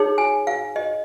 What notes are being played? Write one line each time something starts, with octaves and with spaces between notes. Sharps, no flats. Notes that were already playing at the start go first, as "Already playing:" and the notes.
Already playing: D#4 G#4 C#5
G#5
F5
D#5